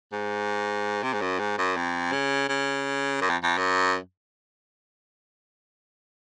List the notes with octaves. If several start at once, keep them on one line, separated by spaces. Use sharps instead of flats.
G#2
C3
G#2
F#2
G#2
F#2
F2
C#3
C#3
F#2
F2
F2
F#2